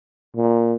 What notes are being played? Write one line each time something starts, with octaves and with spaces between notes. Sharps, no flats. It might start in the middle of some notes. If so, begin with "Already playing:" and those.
A#2